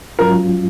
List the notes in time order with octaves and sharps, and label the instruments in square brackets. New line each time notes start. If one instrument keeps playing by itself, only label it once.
[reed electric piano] G#2 F#3 C#4 F4 [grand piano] A#4